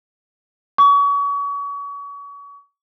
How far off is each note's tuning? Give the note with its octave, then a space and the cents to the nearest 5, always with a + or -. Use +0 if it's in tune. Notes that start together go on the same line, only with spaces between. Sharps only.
C#6 +35